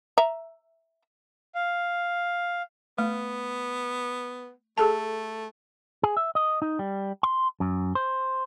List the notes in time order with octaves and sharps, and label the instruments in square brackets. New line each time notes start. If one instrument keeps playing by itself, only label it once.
[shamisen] E5 A#5
[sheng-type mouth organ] F5
[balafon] A3 [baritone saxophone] B3
[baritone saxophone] A3 [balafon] G#4 A4 A5
[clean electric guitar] G#4
E5
D#5
D#4
G3
C6
F#2
C5